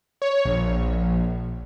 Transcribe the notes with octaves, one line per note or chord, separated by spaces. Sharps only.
C#5
A#1